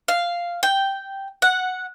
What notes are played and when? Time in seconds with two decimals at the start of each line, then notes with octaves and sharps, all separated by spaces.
0.08 F5
0.63 G5
1.42 F#5